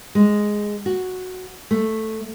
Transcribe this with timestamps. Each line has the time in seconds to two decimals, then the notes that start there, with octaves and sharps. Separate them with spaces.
0.15 G#3
0.86 F#4
1.71 A3